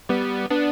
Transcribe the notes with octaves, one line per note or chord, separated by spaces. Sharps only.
G3 B3
B3 D4